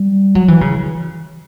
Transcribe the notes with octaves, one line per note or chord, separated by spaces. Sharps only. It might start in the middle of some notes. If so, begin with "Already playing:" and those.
Already playing: G3
F#3
E3
C#3